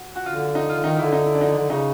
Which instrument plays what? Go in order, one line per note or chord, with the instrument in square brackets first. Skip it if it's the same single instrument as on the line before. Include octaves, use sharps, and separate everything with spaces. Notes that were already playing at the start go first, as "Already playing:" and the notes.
Already playing: [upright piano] F#4
F#4
[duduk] D3 [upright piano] F4
[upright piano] D#4
F4
[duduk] D3
[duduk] D#3 [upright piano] D#4
[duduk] D3 [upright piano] E4
[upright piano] D#4
E4
D4
D#4
[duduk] D3 [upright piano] D4
[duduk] C#3 [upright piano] D#4